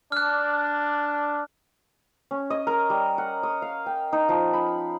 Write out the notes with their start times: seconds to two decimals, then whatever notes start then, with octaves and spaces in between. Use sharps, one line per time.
0.12 D4 F6 F#6
2.31 C#4
2.50 D#5
2.67 A#4
2.90 G3
3.18 F#5
3.43 D#6
3.62 F5
3.86 G5
4.13 D#4
4.29 F3
4.53 B5